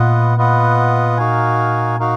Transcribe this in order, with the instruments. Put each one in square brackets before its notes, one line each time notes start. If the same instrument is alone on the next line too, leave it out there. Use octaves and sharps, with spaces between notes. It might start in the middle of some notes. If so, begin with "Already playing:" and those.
Already playing: [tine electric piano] A#2 [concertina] B3 F4 B4 D#5 F#5
[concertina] B3 F4 B4 D#5 F#5
D#4 F#4 A#4 F5 G#5
D#4 F#4 A#4 F5